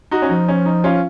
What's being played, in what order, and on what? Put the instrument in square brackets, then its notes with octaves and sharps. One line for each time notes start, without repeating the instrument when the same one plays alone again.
[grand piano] D#4 F#4
C#4
[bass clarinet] F3 [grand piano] D#4
[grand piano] C#4
D#4
C#4 F4